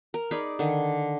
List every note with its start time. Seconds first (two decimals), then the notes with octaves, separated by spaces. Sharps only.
0.14 A#4
0.31 D#4 G#4 D5 B5
0.59 D3 D#3 G#4